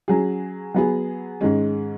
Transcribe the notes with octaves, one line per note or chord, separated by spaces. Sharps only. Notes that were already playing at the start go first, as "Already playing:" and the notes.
F#3 C#4 G#4
F#3 B3 G#4
G#2 D#3 G#3 C#4